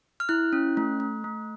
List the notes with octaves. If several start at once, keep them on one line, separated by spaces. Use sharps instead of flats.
F6
E4 F#6
C#4
A3
A3
A3